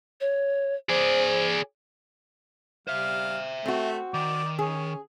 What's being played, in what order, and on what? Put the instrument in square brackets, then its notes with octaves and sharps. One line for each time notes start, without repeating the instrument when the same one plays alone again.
[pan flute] C#5
[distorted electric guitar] G#4 D5 [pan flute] C5
[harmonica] G3 F5 [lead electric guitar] C5 E5
[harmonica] A3 [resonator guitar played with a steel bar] C4 F#4
[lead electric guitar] D#3 [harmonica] D5
[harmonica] C#4 [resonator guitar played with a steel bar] G#4